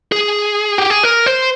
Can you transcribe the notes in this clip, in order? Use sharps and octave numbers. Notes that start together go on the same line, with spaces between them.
G#4
G4
G#4
A#4
C5